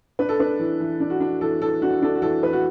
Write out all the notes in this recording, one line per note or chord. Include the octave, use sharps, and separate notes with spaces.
D4 B4
A4
D4 B4
E3
E3
D4
F#4
D4
E3 A4
E3 A4
D4 F#4
D4 A4
F#4
E3 A4
E3 B4
F#4